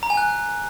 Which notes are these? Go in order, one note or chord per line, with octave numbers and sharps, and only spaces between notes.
A#5
G#5
F#6